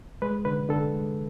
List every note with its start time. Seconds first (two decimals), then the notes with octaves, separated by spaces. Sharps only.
0.22 G#3 B4
0.45 D3 B4
0.69 D3 A4
0.93 G#3